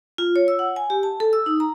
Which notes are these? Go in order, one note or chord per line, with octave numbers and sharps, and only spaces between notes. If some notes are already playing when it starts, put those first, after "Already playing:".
F4
C#5
E6
F#5
G#5
G4
A5
A4
E6
D#4
A#5